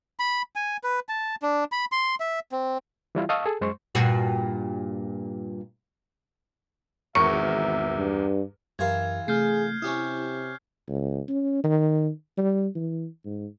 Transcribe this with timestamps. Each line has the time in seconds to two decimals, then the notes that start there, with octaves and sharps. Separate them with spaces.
0.19 B5
0.56 G#5
0.83 B4
1.09 A5
1.42 D4
1.72 B5
1.92 C6
2.20 E5
2.52 C4
3.15 E3 G3 E4 F4
3.29 D#5 F5 A5 C#6 D#6 E6
3.46 G#4 A4
3.61 F#2 G#3 C5 C6 C#6
3.95 G2 A#2 F#4
7.15 G#1 E2 B2 A#4 E5 C#6 C#7
7.97 G2
8.79 F#2 E3 F4 G4 A#4 G#6
9.28 C3 A3 G#4 F6 G6 C7
9.82 C3 C#4 E4 G4 D#6
10.89 C#2
11.29 C#4
11.64 D#3
12.38 G3
12.75 E3
13.25 G#2